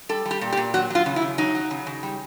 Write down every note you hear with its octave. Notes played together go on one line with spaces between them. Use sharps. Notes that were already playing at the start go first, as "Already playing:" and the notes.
G3 A4
G3
G4
A#2
G4
A#2
F#3 F#4
F#3 F4
C#3
E4
C#3
F#3 D#4
F#3
C#3
C#3
G3